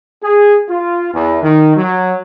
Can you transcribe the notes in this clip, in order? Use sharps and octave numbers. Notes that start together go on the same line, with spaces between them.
G#4
F4
E2
D#3
F#3